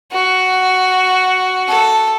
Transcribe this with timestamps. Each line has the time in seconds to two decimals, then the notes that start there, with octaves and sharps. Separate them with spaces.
0.13 F#4
1.68 A4